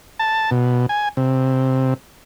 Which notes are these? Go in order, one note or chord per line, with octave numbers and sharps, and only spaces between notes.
A5
B2
G#5
C3